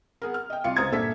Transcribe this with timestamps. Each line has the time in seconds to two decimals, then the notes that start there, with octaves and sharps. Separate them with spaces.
0.22 B3 G#4 A#4
0.34 F6
0.50 D#5 G5
0.64 C2 F4 F5 C#7
0.76 C#2 C5 A#5 D#6 G#6 A6
0.92 G2 A#2 A4 E5 B6